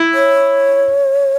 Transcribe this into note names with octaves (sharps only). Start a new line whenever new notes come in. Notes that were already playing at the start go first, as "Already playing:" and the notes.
Already playing: E4
C#5